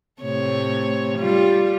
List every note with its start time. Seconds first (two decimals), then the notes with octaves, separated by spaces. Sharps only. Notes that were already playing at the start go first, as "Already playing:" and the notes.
0.22 A2 C3 C#5
1.18 G3 F4